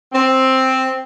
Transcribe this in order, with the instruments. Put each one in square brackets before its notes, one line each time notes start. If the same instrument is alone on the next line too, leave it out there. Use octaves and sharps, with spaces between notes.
[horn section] C4